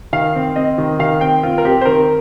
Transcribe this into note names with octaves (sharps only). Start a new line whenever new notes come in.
D#3 F5
C4
C4 D#5
D#3
D#3 F5
C4 G5
C4 F4
A#4
C4 G4
C5
D#3 A#4